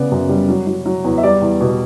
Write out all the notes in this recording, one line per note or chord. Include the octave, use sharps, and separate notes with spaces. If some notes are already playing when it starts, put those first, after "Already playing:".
Already playing: C#3 B3 D5
F#2
G3
F#3
F#3
F#3
E2
E5
G3 D5
E2
B2